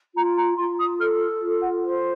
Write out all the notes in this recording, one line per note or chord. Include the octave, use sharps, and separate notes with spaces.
F4 A#5
A#5
F4 C6
D#6
A4 F6
F4
F#5
C5